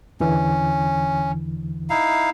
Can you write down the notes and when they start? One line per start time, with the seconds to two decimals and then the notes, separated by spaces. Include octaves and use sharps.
0.20 E2 D3 E3 C#4
1.90 D#4 E4 F5